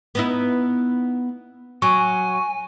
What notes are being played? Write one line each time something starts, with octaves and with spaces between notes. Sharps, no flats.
B3 D#4 E4
F#3 G#5 C#6